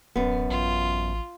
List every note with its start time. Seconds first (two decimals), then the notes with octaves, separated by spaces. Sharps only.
0.16 D1 F#2 B3
0.50 A1 F4